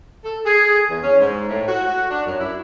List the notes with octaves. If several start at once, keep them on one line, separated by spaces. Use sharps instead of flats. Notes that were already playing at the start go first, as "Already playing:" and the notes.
A4
G#4
E2
C#4
G#2
A2
F#4
D4
F#2
E4